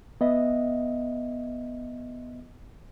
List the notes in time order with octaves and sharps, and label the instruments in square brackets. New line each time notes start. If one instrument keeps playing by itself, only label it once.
[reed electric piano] B3 D#5 E5